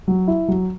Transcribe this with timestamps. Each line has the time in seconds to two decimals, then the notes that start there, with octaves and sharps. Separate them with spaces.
0.08 F#3
0.28 E4
0.48 F#3